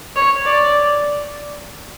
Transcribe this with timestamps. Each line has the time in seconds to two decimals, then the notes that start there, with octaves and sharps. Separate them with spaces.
0.16 C#5
0.45 D5